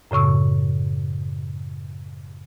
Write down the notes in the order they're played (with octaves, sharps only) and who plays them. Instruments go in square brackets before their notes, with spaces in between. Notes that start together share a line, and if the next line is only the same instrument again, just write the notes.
[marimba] F#2 A2 C#3 C#6 E6